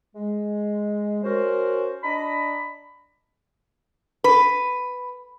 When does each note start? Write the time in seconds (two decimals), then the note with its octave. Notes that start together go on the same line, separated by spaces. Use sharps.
0.15 G#3
1.23 C#4 F#4 A#4 C5
2.03 D4 D#5 A#5 B5
4.24 B4